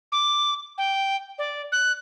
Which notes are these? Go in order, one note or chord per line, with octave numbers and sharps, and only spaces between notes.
D6
G5
D5
F#6